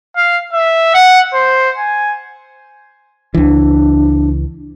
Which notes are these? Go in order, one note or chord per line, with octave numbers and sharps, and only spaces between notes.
F5
E5
F#5
C5
G#5
C#2 E3 D4